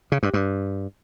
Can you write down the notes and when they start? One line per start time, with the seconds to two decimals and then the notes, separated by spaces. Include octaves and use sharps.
0.12 C#3
0.23 G2
0.34 G2